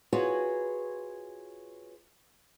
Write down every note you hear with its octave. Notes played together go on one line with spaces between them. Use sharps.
F4 F#4 G#4 B4 C#5